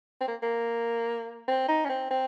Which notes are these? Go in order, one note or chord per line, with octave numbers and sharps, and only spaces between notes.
C4
A#3
A#3
C4
D#4
C#4
C4
C4